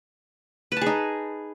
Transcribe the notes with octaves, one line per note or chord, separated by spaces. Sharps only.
D#4 G#4 B4 A5